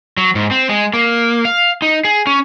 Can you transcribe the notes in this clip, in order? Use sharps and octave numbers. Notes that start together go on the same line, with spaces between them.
F#3
G#2
C4
G#3
A#3
F5
D#4
G#4
C#4